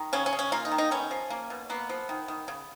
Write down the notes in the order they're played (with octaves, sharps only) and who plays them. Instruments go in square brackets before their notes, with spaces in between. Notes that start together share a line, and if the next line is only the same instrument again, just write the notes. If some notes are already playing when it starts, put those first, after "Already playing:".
Already playing: [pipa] D#3
C#3 C#4
C#4
C#3
C#4
A#3 F4
D#4
D#3
D#4
B3 C#4
F3
A#3
B2
A#3 B3
F3
D#3
D#3
C#3